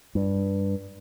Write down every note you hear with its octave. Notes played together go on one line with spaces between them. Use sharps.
G2